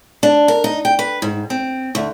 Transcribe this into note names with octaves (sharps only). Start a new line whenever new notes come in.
D4
A#4
D#4
G5
B4
G#2
C4
D2